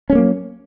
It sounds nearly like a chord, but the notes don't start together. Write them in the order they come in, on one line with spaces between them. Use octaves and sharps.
C#4 A3 A#3 F#3